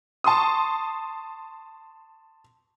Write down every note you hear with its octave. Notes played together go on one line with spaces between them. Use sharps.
A5 C6 C#6 D#6